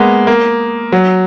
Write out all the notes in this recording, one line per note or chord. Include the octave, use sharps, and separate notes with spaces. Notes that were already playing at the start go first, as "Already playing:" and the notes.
Already playing: G#3 A#3 B3
A#3
F#3